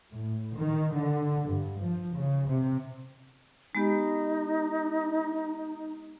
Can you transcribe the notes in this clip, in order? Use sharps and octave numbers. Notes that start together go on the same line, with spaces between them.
A2
D#3
D3
G2
F3
C#3
C3
G#3 B3 D#4 G4